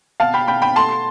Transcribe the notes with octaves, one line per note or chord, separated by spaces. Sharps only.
B2 F5 A5
G5 B5
B2 G5 B5
G5 B5
A3 A5 C6